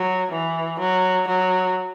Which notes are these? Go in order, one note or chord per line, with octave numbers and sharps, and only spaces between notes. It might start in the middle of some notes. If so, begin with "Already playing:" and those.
Already playing: F#3
E3
F#3
F#3